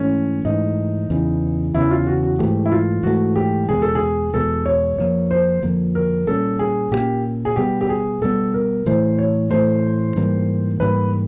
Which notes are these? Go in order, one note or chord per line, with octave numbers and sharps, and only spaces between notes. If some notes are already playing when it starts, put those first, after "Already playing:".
Already playing: G#2 E3 A3 C#4
G#2 E3 A3 D#4
E2 C#3 E3
E2 C#3 E3 E4
F4
F#4
F#4
G#2 E3 A3 G4
E4
F4
G#2 E3 A3 F#4
G4
E2 B2 G#3 G#4
A4
G#4
E2 B2 G#3 A4
C#5
F2 D3 F3 A#3 C#5
C5
F2 D3 F3 A#3
A#4
A#2 G3 A#3 C#4 A4
G#4
A#2 G3 A#3 C#4 G4
G#4
B2 G3 B3 G4
G4
G#4
B2 G3 B3 A4
A#4
A2 E3 A3 C5
C#5
A2 E3 A3 C5
G#2 E3 G3 A#3
G#2 E3 G3 A#3 B4